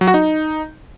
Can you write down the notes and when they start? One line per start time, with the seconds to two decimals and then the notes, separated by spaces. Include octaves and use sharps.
0.01 F#3
0.08 F#4
0.14 D#4